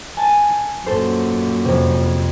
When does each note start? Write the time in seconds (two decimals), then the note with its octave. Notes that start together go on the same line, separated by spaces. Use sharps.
0.17 G#5 A5
0.86 F#2 A#2 A4 C5
1.65 F2 C3